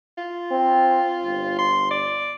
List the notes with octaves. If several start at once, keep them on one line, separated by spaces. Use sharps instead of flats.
F4
C4
G1
C6
D5